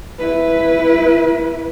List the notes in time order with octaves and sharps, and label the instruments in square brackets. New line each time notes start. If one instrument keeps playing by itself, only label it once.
[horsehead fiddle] E4 B4